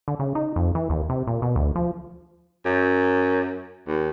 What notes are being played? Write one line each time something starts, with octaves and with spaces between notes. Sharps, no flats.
D3
C#3
D#4
F2
E3
D#2
C3
A#2
B2
D2
F3
F#2
D#2